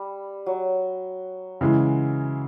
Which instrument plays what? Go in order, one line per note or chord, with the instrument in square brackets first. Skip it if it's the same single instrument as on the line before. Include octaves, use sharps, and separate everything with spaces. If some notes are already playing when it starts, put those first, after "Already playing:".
Already playing: [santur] G3
F#3
[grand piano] C#3 E3 G#3